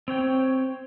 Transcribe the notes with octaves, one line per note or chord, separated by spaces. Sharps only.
C4 C#5 G5